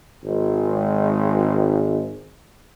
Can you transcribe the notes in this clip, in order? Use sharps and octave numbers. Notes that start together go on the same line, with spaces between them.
G#1 G#3